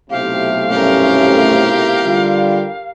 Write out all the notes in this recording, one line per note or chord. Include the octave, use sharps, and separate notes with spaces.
B1 A2 C3 G4 F5
G2 A3 C#4 G4 A#4
D3 G3 F4